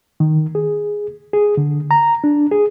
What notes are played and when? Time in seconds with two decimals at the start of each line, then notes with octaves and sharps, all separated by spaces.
0.20 D#3
0.55 G#4
1.33 G#4
1.57 D3
1.91 A#5
2.24 D4
2.51 G#4